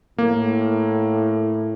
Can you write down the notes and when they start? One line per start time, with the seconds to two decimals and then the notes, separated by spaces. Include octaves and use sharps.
0.18 A2 A#3